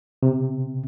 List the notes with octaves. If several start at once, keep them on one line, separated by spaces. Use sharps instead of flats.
C3